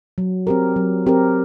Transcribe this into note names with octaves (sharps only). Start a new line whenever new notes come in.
F#3
C4 G4 A#4
F#3
C4 G4 A#4